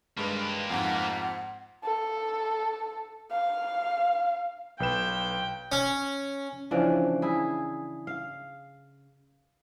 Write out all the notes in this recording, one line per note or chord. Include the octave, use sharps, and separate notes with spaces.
G2 G#3 A#3 G4 B4
F2 G#2 F#5
A4
F5
B1 B4 G5 E7
C#4
C#3 E3 F3 D4
E4 G#4
F5